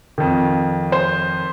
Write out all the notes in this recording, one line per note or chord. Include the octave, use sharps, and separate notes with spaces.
F2 D#3
C5